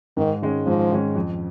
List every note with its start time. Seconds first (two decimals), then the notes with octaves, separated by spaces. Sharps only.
0.17 G#2 D#3
0.42 D#3 G#3 C#4
0.66 G#2 F3
0.91 D#3 G#3 C#4
1.15 F2